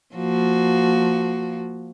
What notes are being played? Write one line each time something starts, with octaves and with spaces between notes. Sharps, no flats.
F3 A#3 F#4